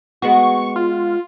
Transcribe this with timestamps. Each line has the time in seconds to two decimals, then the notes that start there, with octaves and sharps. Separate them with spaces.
0.22 G#3 B3 F#4 C#6
0.76 F4